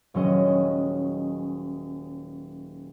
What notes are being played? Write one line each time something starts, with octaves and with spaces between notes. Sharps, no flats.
D#1 F#3 G#3 C#4 D#5